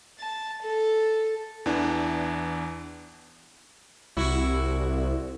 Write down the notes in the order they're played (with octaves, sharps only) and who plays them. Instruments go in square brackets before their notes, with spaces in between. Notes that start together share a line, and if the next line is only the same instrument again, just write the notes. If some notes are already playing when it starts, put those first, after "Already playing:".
[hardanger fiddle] A5
A4
[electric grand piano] E2 E3 D4
[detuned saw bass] C2 [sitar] E4 F#4